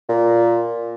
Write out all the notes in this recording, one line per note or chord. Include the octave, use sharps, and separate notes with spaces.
A#2